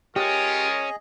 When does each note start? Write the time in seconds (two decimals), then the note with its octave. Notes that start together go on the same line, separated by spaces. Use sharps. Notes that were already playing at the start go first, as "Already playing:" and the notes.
0.16 G#3 C#4 F4 G4 G#4 A#4 D#5